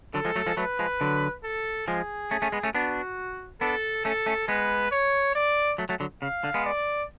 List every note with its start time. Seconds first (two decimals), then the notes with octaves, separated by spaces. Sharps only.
0.14 D3 F#3 A4
0.25 F3 G#3
0.36 F#3 A3
0.47 F3 G#3
0.57 F#3 A3 B4
0.79 F3 G#3
1.01 D3 F#3
1.44 A4
1.88 F3 G#3 G#4
2.31 A3 C#4
2.42 A3 C#4
2.52 G#3 B3
2.63 A3 C#4
2.74 B3 D4 F#4
3.61 B3 D4 A4
4.05 A3 C#4 A4
4.26 A3 C#4
4.48 G#3 B3 B4
4.92 C#5
5.35 D5
5.78 F#3 A3
5.89 F#3 A3
6.00 D3 F#3
6.22 C#3 F5
6.44 D3
6.54 G#3 B3
6.65 D5